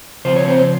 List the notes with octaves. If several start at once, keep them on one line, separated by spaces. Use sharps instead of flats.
C#3 F3 C4 F4 C5
C#5
C4 C5